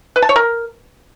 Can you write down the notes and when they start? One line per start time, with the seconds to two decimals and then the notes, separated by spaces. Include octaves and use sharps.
0.16 B4
0.22 A5
0.29 C#5
0.36 A#4